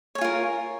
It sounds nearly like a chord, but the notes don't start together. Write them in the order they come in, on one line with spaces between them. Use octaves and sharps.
C#5 G#5 F4 A#4